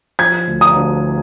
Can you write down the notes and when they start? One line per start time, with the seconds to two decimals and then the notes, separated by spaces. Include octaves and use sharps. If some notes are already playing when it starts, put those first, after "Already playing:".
0.19 F3 G#6
0.48 D2
0.61 D#6
0.76 D2